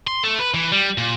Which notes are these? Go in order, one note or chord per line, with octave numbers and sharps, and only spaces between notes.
C6
A3
B4
E3
G3
A#2